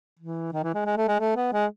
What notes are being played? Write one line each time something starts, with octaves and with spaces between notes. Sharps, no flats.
E3
D#3
E3
G#3
G#3
A3
G#3
A3
B3
G#3